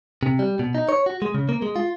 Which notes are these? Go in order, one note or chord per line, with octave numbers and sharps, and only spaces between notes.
C3
G3
B2
D#4
C#5
F#4
G#3
C#3
A#3
G#3
F4